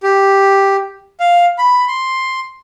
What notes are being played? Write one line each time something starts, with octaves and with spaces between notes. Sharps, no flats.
G4
F5
B5
C6